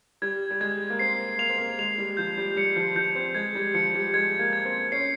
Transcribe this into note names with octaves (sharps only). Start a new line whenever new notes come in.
G3 G#6
G3
G#3 G#6
A#3
C4 C7
A#3 F7
C4
A#3
G#3 F7
G3
F3 G6
G3
G3 C#7
F3
F3 G6
C4
G#3 G#6
G3
F3 C#7
G3
G#3 G#6
A#3
G#6
C4
C#4 C7